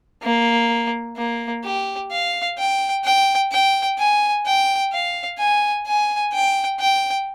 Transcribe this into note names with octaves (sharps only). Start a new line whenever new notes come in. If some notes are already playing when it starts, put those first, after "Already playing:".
A#3
A#3
G4
F5
G5
G5
G5
G#5
G5
F5
G#5
G#5
G5
G5